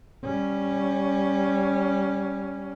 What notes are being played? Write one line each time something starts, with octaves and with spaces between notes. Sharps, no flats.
G3 C#4